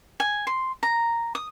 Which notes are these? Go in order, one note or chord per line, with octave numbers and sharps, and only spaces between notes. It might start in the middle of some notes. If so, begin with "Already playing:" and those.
G#5
C6
A#5
D#6